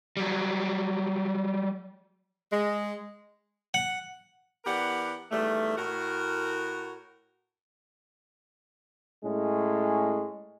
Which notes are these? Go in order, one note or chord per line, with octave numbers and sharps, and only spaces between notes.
F#3 G3
G#3
F#5
E3 B3 G4 A#4 D5 F#5
E2 D#3 G3 A3
A2 F#4 A#4
A2 G#3 C#4